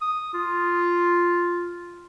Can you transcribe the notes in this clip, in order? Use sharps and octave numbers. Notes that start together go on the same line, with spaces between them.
D#6
F4